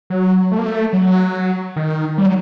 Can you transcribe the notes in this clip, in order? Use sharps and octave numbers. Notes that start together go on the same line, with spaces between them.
F#3
A3
A#3
A3
F#3
D#3
G3
F#3